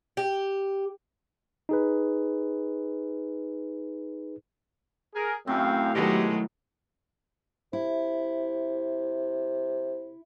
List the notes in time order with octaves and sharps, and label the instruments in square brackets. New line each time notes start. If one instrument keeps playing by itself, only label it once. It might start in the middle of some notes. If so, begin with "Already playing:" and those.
[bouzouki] G4
[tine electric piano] D#4 G#4 B4
[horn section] G#4 A#4
[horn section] F#2 F5 [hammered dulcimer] A2 [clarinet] C4
[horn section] B2 G#3 [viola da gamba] D#3 F#3 A3 [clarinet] G4
[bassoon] C3 [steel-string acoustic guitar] E4